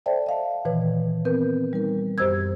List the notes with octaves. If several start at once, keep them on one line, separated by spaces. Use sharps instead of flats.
A4 C5 D5 E5 G5 A5
D#5 F5 A5
A#2 D#3 E3 B4 C#5
B3 C4 A#4 B4 G6
G3 D#4 A#4
F#2 G4 C5 D#5 E6 G#6